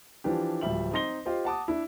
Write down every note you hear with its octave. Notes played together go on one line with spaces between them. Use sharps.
E3 F3 D4 G4
D1 F3 G3 E5 F#7
C4 D#4 D#5 C6 A#6 G7
F4 G4 C5 D#5
F#5 A5 D6 D#6
D4 E4